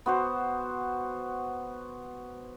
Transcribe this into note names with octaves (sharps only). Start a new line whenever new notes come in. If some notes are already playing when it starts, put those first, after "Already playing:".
B3 F#4 C5